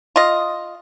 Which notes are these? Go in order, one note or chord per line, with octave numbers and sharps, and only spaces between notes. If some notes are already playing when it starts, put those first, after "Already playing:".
F4 D#5